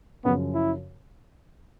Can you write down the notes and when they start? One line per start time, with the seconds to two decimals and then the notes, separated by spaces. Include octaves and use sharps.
0.25 F#2 C#3 F3 B3
0.54 E4